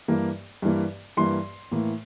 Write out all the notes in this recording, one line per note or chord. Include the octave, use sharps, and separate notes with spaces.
G2 E3 A#3
G2 E3 A#3
G2 E3 A#3 C6
A2 E3 A#3